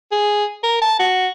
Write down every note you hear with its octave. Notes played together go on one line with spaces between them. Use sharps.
G#4
A#4
A5
F#4